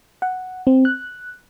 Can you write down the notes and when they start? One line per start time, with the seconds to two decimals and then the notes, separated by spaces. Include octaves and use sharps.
0.22 F#5
0.67 C4
0.85 F#6